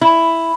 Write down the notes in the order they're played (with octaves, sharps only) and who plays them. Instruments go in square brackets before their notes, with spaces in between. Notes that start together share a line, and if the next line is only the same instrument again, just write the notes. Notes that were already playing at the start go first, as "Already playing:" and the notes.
[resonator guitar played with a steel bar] E4